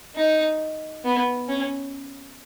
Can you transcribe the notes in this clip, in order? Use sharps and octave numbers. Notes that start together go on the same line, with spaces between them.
D#4
B3
C#4